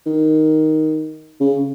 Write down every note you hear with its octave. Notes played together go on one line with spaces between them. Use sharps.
D#3
C#3